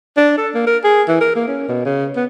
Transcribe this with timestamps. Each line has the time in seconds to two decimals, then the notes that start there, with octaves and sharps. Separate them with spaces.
0.17 D4
0.37 A4
0.54 A#3
0.67 A#4
0.84 G#4
1.08 E3
1.21 A#4
1.35 A#3
1.47 C#4
1.68 B2
1.85 C#3
2.16 B3